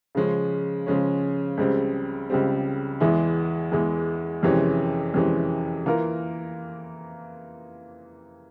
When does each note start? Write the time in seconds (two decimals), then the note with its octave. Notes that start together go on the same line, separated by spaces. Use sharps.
0.15 C#3 F3 G#3 C#4
0.86 C#3 F3 G#3 C#4
1.57 C#2 C#3 G3 C4
2.30 C#2 C#3 G3 C4
3.00 E2 E3 G#3 E4
3.72 E2 E3 G#3 E4
4.43 F2 C3 E3 G#3 C#4
5.14 F2 C3 E3 G#3 C#4
5.86 E3 A#3 F4 A#4